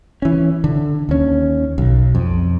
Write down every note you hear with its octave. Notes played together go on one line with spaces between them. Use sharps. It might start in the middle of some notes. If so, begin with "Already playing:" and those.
E3 C#4
D3
D#2 C#4
B1
F2